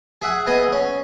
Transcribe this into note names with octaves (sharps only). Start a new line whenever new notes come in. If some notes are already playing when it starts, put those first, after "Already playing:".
G#4 E5 F#5
B3 G#4 D#5 D#6
C#4